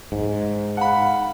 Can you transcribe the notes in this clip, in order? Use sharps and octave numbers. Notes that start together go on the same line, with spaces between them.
G#2
F5 F#5 B5